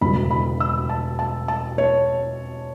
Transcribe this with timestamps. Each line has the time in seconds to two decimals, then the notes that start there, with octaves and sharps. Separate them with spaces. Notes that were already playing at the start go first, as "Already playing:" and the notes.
0.01 E1 D2 C#3 E3 G3 B5
0.31 B5
0.60 E6
0.89 A5
1.19 A5
1.48 A5
1.78 C#5